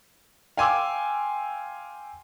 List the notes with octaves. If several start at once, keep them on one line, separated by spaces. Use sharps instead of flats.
F5 G5 G#5 C6 D6 E6